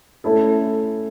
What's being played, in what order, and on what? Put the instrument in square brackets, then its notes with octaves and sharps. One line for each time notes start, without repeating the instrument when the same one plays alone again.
[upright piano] A3 C#4 E4 A4